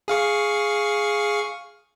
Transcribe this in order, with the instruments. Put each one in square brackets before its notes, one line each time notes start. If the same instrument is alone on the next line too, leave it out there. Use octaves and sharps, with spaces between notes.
[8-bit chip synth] G#4 F5 C#6